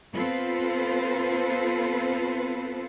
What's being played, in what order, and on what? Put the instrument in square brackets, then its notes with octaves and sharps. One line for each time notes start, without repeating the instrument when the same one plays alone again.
[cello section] B3 C4 F4 A4 B4 C5